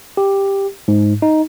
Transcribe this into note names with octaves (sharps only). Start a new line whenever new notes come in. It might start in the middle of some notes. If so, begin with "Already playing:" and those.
G4
G#2
D#4